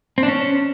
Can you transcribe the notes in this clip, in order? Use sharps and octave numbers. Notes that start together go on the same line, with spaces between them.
C4
D4
C#4